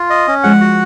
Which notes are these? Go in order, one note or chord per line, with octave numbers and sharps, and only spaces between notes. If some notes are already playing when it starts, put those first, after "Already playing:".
Already playing: F4
D#5
C#4
F3 G#3 F#5
F#4